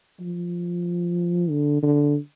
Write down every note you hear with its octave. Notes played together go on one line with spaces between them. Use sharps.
F3
D3
D3